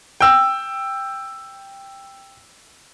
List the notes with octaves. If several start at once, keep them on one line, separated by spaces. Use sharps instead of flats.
G5 E6